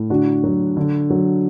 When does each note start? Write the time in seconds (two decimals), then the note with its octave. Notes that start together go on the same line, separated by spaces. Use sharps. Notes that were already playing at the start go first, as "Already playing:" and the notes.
Already playing: A2
0.10 D3 D4 F#4
0.44 F#3
0.77 D3
1.10 F#3